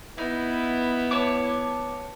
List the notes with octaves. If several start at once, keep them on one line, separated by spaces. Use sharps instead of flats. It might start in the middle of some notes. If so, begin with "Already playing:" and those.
B3 D#4 E4
C#5 A5 D6